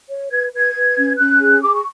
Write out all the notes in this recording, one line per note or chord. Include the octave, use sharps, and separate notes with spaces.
C#5
B4 G#6
B4 G#6
B4
C#4
C#4 F#6
G#4
G#4 D6
C#6